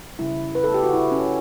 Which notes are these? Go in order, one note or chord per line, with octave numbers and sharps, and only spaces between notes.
C#3 G3 E4
B4
A4
G4
F#4
E4
C#4